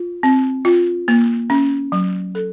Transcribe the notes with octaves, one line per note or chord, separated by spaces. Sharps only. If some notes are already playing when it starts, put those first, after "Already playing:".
Already playing: F4
C4
F4
A#3
C#4
F#3
A4